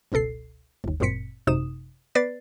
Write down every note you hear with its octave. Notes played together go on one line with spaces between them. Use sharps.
G1 C#2 B2 A4 C7
G1 D#2
G1 F#2 A#2 C4 B6 C#7
G#1 F#2 C3 D#4 D#6 E7
B3 B4 D5 A6 C7